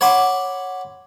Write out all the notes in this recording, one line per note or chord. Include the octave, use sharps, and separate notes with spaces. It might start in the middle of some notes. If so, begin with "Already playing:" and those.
C#5 F#5 B5 C6 D6